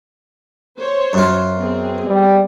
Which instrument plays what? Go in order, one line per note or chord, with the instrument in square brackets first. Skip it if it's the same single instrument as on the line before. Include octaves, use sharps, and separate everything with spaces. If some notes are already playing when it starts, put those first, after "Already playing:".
[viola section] C5 C#5
[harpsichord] F#2 F4
[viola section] B3 C4 G#4
[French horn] G3